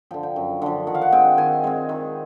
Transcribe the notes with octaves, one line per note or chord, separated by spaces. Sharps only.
D3 F3 G5
G5
F#2
D3 F3
D#3 F#5
F5
F#5
G#3 C4 G5
D#3 G#5
G#3 C4
D#3